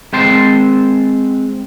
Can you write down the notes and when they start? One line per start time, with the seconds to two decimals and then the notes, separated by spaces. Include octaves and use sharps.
0.13 G#3 C4 G5 A5 C6